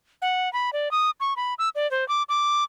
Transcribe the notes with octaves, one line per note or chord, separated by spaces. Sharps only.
F#5
B5
D5
D#6
C#6
B5
E6
D5
C5
D6
D6